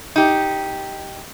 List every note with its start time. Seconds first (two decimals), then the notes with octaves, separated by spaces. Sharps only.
0.16 D#4 G4